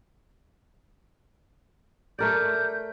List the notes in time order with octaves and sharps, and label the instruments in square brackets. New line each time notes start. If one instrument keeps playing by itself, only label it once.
[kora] A3 A#4 D5 [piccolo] G6